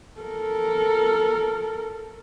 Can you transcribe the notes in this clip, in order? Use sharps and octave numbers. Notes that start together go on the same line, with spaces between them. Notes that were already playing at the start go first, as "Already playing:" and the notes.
A4 A#4